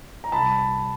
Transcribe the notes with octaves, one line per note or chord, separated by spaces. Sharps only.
A#5
C2 A5 B5